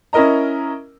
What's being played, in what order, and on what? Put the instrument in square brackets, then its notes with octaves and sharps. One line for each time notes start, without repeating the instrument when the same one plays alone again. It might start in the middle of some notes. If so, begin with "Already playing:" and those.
[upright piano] C#4 E4 A#4 D#5 A#5